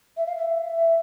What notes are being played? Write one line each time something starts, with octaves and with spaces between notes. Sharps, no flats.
E5
F5
E5